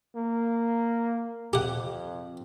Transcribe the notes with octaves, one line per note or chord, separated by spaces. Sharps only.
A#3
F2 G4 F#5